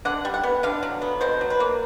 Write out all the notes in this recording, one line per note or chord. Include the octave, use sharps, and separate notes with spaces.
D3 F#5
G3
F#5
B3
D3 F5
F#3
B3
B2 C5
F#3
B4
A#3